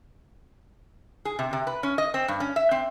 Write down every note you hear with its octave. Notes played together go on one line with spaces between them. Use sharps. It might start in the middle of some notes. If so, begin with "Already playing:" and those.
G#4
C3
C3
B4
C#4
D#5
C4
G2
C#4
E5
C4